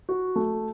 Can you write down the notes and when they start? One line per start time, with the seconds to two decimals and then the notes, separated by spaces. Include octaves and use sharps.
0.09 F#4
0.36 A3